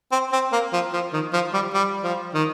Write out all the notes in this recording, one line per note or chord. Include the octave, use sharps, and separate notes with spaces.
C4
C4
A#3
F3
F3
D#3
F3
G3
G3
F3
D#3